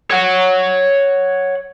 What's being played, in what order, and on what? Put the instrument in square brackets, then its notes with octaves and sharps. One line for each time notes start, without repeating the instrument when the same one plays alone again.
[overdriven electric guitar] C#5 F#5